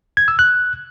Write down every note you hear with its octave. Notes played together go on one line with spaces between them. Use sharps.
G#6
E6
F#6